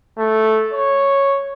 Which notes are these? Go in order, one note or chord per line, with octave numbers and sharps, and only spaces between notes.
A3
C#5